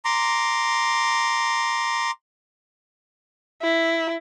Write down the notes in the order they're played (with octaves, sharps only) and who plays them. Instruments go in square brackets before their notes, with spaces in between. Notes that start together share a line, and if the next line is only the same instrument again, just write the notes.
[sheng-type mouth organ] A#5 C6 D6
[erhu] E4